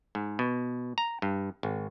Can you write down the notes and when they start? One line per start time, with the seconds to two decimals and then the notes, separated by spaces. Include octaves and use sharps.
0.15 G#2
0.39 B2
0.98 A#5
1.22 G2
1.63 G#1